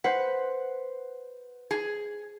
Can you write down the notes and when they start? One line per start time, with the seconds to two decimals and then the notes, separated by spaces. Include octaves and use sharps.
0.04 B4 C5 F#5
1.71 G#4